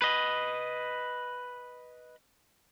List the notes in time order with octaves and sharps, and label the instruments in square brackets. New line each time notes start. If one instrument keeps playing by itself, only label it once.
[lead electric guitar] B4 D#5